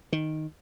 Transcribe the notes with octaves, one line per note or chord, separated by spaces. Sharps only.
D#3